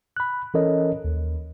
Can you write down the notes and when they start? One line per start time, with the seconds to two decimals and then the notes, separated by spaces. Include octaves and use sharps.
0.17 B5 F#6
0.54 E3 C#4 A4 A#4 C#5 D#5
1.04 D#2